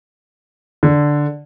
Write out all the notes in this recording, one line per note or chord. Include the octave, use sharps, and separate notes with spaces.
D3